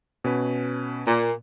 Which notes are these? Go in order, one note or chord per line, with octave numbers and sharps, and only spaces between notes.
B2 C#4 B4
A#2